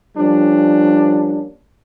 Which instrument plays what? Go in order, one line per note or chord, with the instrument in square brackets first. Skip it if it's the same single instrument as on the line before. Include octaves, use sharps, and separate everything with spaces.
[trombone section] F3 G3 A#3 C#4 D4